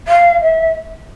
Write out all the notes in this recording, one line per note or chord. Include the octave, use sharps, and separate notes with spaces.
F5
E5